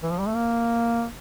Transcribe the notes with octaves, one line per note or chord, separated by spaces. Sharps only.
E3
F3
G3
A3
A#3